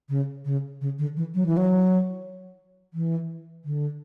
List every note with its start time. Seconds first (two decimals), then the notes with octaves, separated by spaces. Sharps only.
0.09 C#3
0.45 C#3
0.81 C#3
0.99 D3
1.17 E3
1.35 F#3
1.46 E3
1.57 F#3
2.94 E3
3.65 D3